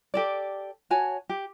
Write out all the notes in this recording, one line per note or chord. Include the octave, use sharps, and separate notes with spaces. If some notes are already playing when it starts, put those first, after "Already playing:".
G4 A4 D5
F#4 C#5 G#5 A5
G4